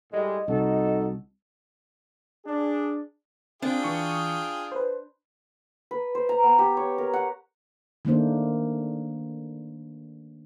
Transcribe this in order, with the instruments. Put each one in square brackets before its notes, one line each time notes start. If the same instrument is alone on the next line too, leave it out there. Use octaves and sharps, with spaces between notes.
[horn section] A2 G3 G#3 [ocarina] D#5
[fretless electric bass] C2 [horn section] D#4 F#4 A4
[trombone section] D4 G#4
[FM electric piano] C4 [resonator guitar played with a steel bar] D4 [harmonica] F4 G#4 G5
[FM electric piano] E3 C#6 D#6
B4 C5
[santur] B4
C5
A#5
B3
G4
C#5
A#4
F#5
[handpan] D#3 A3 A#3 D4 C5